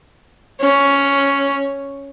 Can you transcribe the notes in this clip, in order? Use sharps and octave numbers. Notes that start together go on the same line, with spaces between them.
C#4